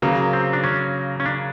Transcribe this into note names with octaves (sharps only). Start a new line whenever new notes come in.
C#3 F#3 A#3
C4
D4
C#4
C#4
D4